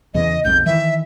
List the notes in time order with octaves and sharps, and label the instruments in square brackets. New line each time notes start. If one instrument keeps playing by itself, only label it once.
[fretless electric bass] E2 C#3 E3 [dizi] D#5
[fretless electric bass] B1 F2 G#2 [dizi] G6
[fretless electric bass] D#3 E3 [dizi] E5